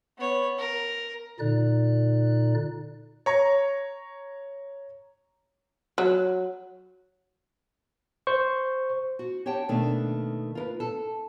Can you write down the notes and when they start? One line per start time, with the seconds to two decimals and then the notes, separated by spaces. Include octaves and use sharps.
0.18 B3 C#5
0.58 A#4
1.39 A#2 D3 D#4 D5 F#6
3.26 C#5 A#5 C#6
5.98 F#3
8.27 C5 C#6
9.19 F#4
9.46 G4 C#5 F#5 G5 A5
9.69 B2 D#3 A3 A#3 D4
10.55 F4 A#4 B4
10.80 A4